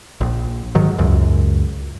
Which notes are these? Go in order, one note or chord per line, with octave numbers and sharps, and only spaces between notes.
A#1
G#2 D#3 F#3
C#2 F#2